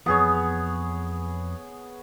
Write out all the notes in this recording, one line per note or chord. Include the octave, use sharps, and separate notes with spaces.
F2 E3 B3 G#4 C#5